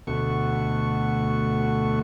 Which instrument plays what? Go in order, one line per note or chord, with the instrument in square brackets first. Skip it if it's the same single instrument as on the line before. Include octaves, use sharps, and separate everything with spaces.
[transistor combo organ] D2 B2 A3 F#4 C#6